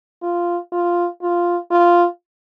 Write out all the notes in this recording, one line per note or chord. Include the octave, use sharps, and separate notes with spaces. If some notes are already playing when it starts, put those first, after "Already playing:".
F4
F4
F4
F4